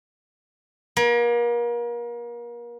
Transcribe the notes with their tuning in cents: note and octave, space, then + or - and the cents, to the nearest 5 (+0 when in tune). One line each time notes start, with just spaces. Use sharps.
A#3 +35